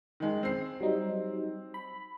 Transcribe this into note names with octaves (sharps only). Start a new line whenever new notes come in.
D#3 G#3
C4 C7
F#3 G3 D#4
B5